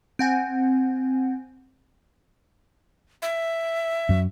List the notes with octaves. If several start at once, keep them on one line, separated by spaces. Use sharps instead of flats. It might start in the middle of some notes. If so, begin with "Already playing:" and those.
C4 F#5 G#5
E5
F#2 F#3